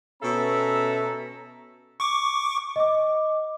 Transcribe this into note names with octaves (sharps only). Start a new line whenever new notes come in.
B2 C#4 A4 E5 A#5
C#6 D6
D#5 D6